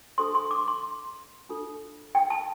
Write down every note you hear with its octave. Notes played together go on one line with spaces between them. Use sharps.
D4 A4 C5 C6
C6
D6
C6
D4 F4 A4
G5
A5